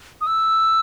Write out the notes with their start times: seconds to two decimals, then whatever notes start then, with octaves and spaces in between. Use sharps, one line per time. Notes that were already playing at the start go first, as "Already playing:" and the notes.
0.21 D#6
0.27 E6